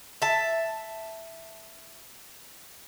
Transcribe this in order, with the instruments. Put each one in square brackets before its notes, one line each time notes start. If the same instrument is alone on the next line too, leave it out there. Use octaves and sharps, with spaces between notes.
[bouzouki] E5 A5